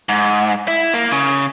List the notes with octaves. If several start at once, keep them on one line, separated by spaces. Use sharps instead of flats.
G#2
E4
A#3
C#3